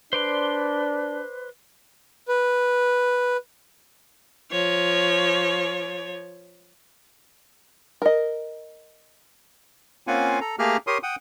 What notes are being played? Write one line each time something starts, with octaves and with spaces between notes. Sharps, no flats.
D4 B4 C5 D5 C6
B4
F3 C#5
A#4 D#5
A#3 C4 C#4 F4 F#5 G#5
A4 A#5
A3 A#3 G4 G#4 A#5 F6
G4 A#4 C#5 C6 D#6
F#5 G5 D#6